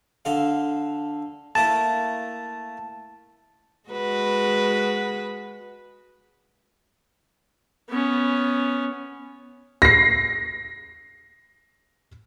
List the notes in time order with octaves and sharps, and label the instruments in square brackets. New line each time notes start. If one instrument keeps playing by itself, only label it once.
[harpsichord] D3 A4 F5
[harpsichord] A3 A#3 E4 [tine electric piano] A5
[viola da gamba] G#3 F#4 B4
[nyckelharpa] B3 C#4
[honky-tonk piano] A#6 C7